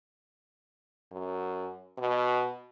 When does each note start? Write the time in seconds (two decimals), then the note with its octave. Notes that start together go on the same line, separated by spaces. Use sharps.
1.12 F#2
1.98 B2